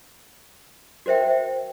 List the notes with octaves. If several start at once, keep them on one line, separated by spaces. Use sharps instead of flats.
F#4 A#4 C5 E5 G5